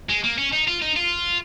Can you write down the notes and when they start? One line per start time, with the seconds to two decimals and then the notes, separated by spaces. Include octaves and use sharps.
0.09 G#3
0.24 A#3
0.38 C#4
0.53 D#4
0.68 F4
0.82 D#4
0.97 F4